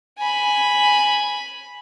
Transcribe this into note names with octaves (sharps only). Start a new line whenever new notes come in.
G#5 B5